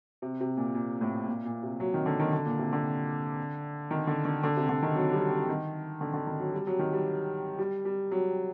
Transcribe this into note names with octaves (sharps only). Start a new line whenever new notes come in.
C3
C3
A#2
A#2
A2
A#2
A#2
C3
F#3
D#3
D3
D#3
D3
A#2
C3
D3
D#3
D3
D3
D3
C3
D3
D#3
F#3
G3
F#3
D#3
D3
D3
D#3
F#3
G3
F#3
D#3
G3
G3
G3
F#3